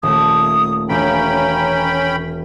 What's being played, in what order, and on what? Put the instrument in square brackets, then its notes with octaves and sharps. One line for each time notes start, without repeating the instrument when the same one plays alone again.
[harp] D#1 A3 [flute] D#6
[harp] E1 B6 [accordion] C#4 G5 B5 [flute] A#5